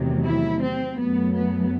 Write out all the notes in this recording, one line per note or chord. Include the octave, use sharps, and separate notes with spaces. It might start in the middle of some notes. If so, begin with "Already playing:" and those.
Already playing: E2 C3 D#3 F#3 A3
E4
C4
F#2 F#3 A3 B3
B3